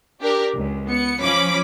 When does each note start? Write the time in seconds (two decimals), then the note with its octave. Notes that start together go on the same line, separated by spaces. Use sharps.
0.21 D4 G4 A#4
0.53 C#2
0.87 B3 C#7
1.21 F3 C#4 B5 D6